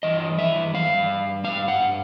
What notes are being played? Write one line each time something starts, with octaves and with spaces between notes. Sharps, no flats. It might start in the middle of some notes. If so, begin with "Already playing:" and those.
G2 E3 D#5
E5
G2 E3 G3 F5
G2 E3 G3 F5
F#5